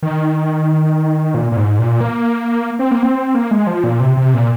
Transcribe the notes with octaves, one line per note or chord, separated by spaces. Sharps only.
D#3
A#2
A#2
G#2
A#2
A#3
C4
A#3
C4
A#3
G#3
F3
A#2
C3
C3
A#2